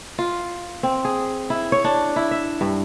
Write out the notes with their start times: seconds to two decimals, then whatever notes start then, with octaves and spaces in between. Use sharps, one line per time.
0.19 F4
0.83 C4
1.05 G#4
1.50 E4
1.72 C#5
1.84 D4
2.16 E4
2.31 E5
2.61 G2